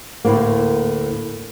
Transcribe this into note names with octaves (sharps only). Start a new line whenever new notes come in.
D2 A2 A#3